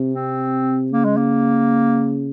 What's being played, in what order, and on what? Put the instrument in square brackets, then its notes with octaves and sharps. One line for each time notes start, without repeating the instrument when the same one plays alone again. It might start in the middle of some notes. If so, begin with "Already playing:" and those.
Already playing: [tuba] C3
[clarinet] C4
[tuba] C#3 [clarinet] A#3
[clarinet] G#3
A#3